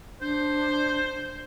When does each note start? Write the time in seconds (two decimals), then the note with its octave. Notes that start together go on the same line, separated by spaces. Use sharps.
0.21 D4 C5